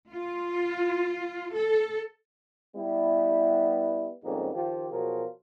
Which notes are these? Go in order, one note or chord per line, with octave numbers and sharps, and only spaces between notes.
F4
A4
G3 B3 E4
F2 G#2 C#3 G3 A#3 D#4
D#3 F3 F4 G4
B2 F3 F#3 F4 G#4 A#4